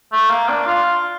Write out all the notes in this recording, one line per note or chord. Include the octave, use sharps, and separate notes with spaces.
A3
A#3
D4
F4